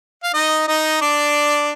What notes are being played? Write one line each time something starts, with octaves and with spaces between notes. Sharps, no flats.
F5
D#4 D#5
D#4 D#5
D4 D5